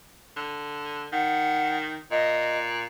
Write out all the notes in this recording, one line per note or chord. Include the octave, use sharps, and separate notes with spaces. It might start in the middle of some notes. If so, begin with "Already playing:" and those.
D3
D#3 F#5
A#2 D#5